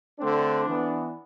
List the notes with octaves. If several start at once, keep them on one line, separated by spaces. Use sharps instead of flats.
D3 A3 C4 D4
E3 B3